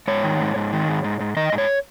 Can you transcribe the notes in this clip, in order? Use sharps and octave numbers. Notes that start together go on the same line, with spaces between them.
G#2 C#5
D#3
G#2
G#2
D#3
G#2
G#2
G#2
D#3 D#5
G#2
C#5